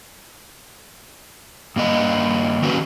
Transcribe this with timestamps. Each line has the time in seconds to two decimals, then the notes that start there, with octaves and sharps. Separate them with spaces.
1.76 G2 A#3 D#5
2.62 D#3 A#3 C#4 F#4 B4